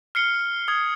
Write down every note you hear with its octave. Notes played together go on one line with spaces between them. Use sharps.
F6 C7 C#7 G7
D#6 G#6